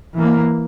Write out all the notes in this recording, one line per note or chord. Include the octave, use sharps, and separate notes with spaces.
E3 A#3